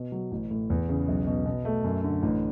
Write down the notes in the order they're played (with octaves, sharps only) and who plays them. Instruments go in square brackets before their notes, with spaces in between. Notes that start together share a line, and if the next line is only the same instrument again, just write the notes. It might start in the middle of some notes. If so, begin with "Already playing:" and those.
Already playing: [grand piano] B2
F#3
A1
A2
E2
C#3
B1
B2
B2
A3
F#2
D3
A1